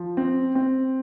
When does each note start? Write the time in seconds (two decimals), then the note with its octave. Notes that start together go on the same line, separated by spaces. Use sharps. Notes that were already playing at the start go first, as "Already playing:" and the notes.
Already playing: F3
0.17 C4
0.55 C4